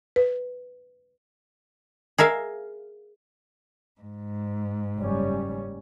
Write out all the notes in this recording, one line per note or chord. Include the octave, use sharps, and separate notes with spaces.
B4
G#4 A#4 E5 F5
G#2
F#1 G3 C#4